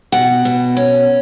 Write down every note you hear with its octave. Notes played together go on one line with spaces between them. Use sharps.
B2 F#5
B2
C#4